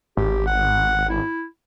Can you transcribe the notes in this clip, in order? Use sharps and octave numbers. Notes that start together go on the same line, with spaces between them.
G#1 G4
F#5
E4